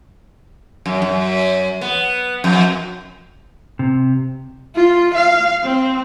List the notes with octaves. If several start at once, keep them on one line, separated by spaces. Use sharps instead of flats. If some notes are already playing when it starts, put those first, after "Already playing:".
F#2
F#2
B3
F2
C3
F4
F5
C4